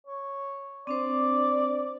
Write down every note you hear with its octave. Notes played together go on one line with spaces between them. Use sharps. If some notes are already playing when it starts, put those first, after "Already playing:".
C#5
C4 D4 C5 D5